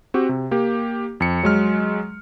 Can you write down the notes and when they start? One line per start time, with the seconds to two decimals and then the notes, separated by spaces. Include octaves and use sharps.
0.14 C4 F#4 G4
0.29 C3
0.51 A#3 G4
1.20 F2 C#7
1.43 F#3 G#3 F6